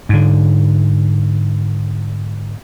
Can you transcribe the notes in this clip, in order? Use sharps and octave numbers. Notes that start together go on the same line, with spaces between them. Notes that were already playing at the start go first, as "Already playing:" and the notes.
G#2 D3